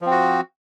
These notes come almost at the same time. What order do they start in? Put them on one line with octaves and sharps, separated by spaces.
F3 C4 F#4